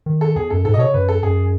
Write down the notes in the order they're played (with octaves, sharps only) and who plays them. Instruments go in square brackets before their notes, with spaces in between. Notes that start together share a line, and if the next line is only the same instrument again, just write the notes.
[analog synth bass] D#3
[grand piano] A4
[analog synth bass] E2 [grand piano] G#4
[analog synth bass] F#2 [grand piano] A4
[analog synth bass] G#2 [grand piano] A4
[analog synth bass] B2 [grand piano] D#5
[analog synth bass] C#3 [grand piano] C#5
[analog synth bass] F#2 [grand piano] B4
[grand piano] A4
[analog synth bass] F#2 [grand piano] G#4